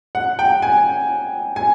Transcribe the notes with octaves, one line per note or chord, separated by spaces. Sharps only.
F#5
G5
G#5
G#5